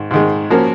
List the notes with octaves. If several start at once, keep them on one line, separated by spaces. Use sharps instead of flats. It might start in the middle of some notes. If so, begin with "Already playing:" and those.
Already playing: G#2 D#3
G#2 D#3 G#3
F3 A#3 C#4 F#4 A#4